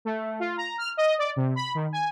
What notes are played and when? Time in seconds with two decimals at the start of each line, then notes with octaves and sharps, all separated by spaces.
0.05 A3
0.40 F4
0.57 A#5
0.78 F6
0.97 D#5
1.18 D5
1.36 C3
1.56 B5
1.75 D#3
1.93 G#5